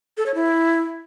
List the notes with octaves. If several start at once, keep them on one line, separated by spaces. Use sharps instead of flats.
A4
C#5
E4